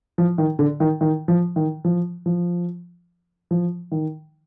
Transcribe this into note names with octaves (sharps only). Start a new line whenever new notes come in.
F3
D#3
D3
D#3
D#3
F3
D#3
F3
F3
F3
D#3